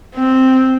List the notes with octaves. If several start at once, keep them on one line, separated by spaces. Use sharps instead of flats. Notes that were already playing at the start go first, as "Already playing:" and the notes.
C4